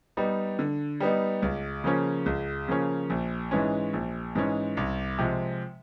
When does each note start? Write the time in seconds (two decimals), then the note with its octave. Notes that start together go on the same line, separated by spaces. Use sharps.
0.17 G3 B3 D#4
0.59 D3
1.00 G3 B3 D#4
1.42 C#2
1.84 C#3 F3 A#3 C#4
2.26 C#2
2.68 C#3 F3 A#3 C#4
3.10 A#1
3.51 G#2 E3 G#3 C#4
3.93 A#1
4.35 G#2 E3 G#3 C#4
4.77 C2
5.19 C3 F3 G#3